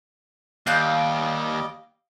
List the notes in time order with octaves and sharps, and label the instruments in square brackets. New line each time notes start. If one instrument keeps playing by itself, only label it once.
[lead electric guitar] D#2 [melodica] G3 D#5 D6 [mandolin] F5 F#6 G6